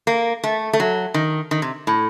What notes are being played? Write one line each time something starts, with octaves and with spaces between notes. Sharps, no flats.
A#3
A3
A3
F#3
D#3
D#3
C3
A2